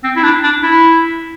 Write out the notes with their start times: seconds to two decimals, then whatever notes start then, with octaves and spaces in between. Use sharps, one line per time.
0.04 C4
0.16 E4
0.23 D4
0.43 D4
0.63 E4